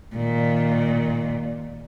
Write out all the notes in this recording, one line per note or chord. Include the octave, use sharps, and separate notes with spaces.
A#2 D#3